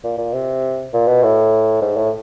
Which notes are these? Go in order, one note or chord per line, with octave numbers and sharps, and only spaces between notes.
A#2
A#2
C3
A#2
B2
A2
G#2
A2